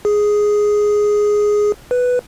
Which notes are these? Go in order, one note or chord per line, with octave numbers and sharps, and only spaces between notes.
G#4
B4